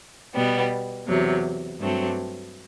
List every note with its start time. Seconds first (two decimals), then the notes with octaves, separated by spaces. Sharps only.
0.34 B2 G3 B3
1.07 E2 C3 F#3
1.79 G2 F#3 A3 C4